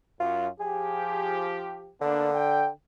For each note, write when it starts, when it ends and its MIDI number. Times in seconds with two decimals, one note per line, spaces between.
0.20 0.47 42
0.20 0.48 65
0.60 1.92 53
0.60 1.92 67
0.60 1.49 68
2.01 2.69 50
2.01 2.29 58
2.01 2.29 59
2.01 2.29 62
2.35 2.68 79